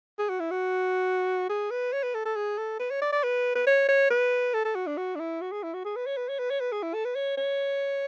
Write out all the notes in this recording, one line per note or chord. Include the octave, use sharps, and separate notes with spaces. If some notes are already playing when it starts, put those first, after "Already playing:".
G#4
F#4
E4
F#4
G#4
B4
C#5
B4
A4
A4
G#4
A4
B4
C#5
D5
D5
B4
B4
C#5
C#5
B4
A4
A4
F#4
D4
F#4
D4
E4
F#4
G#4
E4
F#4
G#4
B4
C#5
B4
C#5
B4
C#5
B4
G#4
E4
A4
B4
C#5
C#5